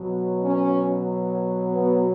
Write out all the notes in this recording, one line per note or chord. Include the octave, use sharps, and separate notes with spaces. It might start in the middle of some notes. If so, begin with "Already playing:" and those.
Already playing: B2 F#3
C#4
B3